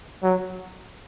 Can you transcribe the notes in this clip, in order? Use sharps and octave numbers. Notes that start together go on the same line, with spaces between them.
F#3